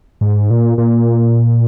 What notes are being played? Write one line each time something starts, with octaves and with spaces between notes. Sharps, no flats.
G#2
A#2
A#2